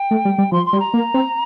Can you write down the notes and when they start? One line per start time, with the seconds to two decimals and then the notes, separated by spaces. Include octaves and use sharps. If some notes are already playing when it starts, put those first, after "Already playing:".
Already playing: G5
0.11 A3
0.25 G3
0.38 G3
0.52 F3 C6
0.65 C6
0.73 G3
0.79 A#5
0.94 A#3
1.14 C4